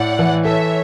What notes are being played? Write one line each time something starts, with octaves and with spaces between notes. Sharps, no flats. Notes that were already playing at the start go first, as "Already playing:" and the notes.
Already playing: A2 D5 F#5
E3
A4 C#5 E5